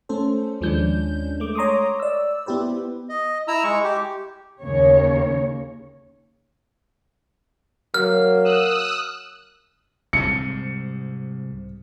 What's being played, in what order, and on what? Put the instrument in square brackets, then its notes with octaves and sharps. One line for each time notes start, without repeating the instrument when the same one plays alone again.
[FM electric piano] A3 C#4 A4 C5
D#2 F3 G#3 C#4 D4 G6
G#3 A3 D6
C#5 A#5 C6 D6 D#6
D5 E6
B3 E4 G4 B4 C5
[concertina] D#5
E4 A#5 E6
G#3 C#6
G4
[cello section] D#2 C#3 A#3 C#5
[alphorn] F#3 [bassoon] A#3 [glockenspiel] F6
[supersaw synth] D#6 E6 F#6
[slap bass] C2 G#2 C3 [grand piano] C#7